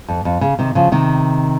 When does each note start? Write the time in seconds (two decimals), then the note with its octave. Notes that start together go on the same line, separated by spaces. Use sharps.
0.08 F2
0.25 F2
0.41 C#3
0.59 C3 D#3
0.75 C#3 F3
0.92 C3 D#3